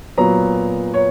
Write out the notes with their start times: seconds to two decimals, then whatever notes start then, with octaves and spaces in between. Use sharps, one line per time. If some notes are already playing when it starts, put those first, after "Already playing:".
0.18 A#2 F#3 B3 A#5
0.94 C#5